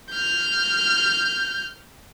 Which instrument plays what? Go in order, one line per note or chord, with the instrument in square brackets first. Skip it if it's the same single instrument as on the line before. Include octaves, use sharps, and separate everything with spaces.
[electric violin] F6 G6